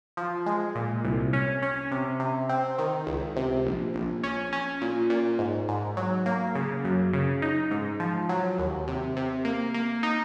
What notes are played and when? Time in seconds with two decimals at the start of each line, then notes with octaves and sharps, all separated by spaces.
0.17 F3
0.46 G#3
0.75 A#2
1.04 C2
1.33 C#4
1.62 C#4
1.92 C3
2.20 C3
2.49 C4
2.78 D#3
3.07 C#2
3.36 C3
3.65 A#1
3.94 A#1
4.24 C#4
4.53 C#4
4.82 A#2
5.10 A#2
5.39 G#2
5.69 G#2
5.97 F#3
6.26 A#3
6.55 C#3
6.84 F#2
7.13 C#3
7.42 D#4
7.71 G#2
8.00 F3
8.29 F#3
8.58 D#2
8.87 C3
9.17 C3
9.45 A#3
9.74 A#3
10.03 D#4